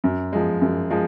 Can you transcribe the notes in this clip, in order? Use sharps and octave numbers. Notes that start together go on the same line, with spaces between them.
F#2
F3 G#3
F#2
F3 G#3